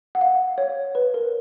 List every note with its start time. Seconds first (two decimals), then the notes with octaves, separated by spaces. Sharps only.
0.15 F#5
0.21 F5
0.58 C#5
0.95 B4
1.14 A#4